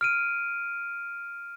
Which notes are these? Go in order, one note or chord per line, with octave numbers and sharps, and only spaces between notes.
F6 D7 D#7